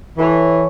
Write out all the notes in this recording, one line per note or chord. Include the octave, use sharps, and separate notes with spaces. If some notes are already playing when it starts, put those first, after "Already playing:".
E3 E4 A4 C#5